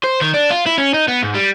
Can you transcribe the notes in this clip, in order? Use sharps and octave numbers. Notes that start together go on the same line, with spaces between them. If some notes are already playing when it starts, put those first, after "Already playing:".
C5
D#3
D4
F4
E4
C#4
D#4
B3
G#2
G3